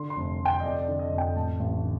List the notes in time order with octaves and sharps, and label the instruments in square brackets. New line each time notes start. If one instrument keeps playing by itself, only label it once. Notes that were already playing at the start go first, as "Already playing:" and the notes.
Already playing: [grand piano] D3 C6
C6
F1
F1
G5
D#5
F2 D5
D5
D3
D#5
F2
G5
A1 A5
A1
D3